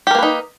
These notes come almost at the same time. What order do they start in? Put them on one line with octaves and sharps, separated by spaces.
G4 A#4 A#3 B4 D#4